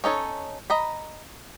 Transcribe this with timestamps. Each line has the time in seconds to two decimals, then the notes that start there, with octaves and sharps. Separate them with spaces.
0.04 C#4 D#4 A4 C#5
0.70 D#5 A#5 B5